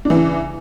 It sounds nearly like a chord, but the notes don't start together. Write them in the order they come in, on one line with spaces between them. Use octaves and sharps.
D4 E3 C#3